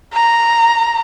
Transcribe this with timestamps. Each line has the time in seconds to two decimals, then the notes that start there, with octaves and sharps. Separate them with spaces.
0.13 A#5